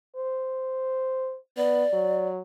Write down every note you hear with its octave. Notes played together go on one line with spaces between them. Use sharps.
C5
B3 D5
F#3